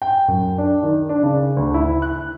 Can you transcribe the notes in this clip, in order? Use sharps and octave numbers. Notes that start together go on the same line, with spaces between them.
G5
F#2
D4
D#3
D4
C#3
D2
E4
F#6